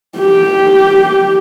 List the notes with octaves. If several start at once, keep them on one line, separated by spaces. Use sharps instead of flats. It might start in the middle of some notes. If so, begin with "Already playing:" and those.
G4